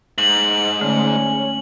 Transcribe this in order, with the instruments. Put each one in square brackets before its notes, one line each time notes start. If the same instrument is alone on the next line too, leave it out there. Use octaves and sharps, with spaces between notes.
[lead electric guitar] G#2 [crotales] F#7
[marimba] D3 A3 [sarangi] C#4